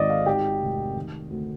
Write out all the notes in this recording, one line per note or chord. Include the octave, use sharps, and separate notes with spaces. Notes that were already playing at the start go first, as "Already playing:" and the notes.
Already playing: G#1 D#3 D5 D#5
F5
D#3 G4
F1
D#3
D2